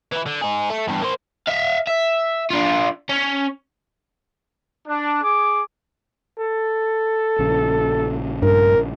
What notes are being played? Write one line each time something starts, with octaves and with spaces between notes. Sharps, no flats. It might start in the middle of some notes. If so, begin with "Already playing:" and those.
E3 E4
D3
D#4 G#4
A3
E2 G2
A#3 C5
E5 F5
E5
D4 F4
C#4
D4
G#4 D6
A4
A#1 C#3
G2 A#4